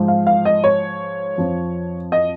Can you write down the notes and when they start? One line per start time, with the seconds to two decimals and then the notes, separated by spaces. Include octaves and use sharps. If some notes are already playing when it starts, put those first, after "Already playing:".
Already playing: G#2 F3
0.08 F5
0.27 F5
0.45 D#5
0.64 C#5
1.38 F2 F3
2.12 D#5